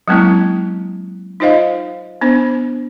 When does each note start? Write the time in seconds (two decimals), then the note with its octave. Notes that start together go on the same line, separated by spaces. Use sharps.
0.08 F#3 G#3 A#3 C4 C#4 E4
1.40 D#4 F4 C5 D#5 F5
2.21 B3 D4 C5